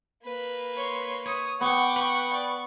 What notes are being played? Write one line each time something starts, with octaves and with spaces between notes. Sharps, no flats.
A#3 B4
C#5 C6
C#5 D#6
B3 F#5 G5 C#6 D6
B4 C#6
D5